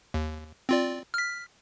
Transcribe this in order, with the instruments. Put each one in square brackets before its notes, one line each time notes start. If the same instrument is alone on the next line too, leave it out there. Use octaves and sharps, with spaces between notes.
[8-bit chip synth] D#2
C4 F4 D5
F6 B6